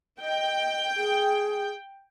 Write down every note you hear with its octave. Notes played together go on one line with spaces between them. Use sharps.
D#5 G5
G#4